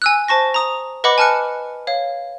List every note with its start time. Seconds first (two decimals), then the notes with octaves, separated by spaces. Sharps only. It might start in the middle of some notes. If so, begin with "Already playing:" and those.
0.02 G#5 E6 F#6
0.28 C5 A5 C#6 A#6
0.54 A#5 D#6 F7
1.04 B4 D#5 F#5 B5 D6
1.18 G#5 A5 F6 F#6 C#7
1.87 C#5 F5